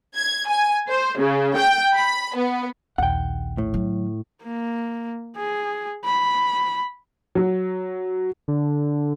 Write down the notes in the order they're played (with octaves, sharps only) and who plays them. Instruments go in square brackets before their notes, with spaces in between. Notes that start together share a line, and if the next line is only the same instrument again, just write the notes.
[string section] G#6
G#5
C5
C#3
G5
B5
B3
[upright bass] A#1 D#2 [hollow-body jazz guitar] F#5 G5
[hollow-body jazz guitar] A2
[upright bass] D3 F#3
[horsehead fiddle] A#3
G#4
B5
[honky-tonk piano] F#3
[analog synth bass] D3